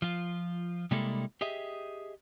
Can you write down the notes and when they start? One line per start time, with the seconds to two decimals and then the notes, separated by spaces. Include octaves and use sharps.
0.02 F3 F4
0.91 C3 G3 G#3 A#3 E4 A4
1.41 G4 G#4 D#5 E5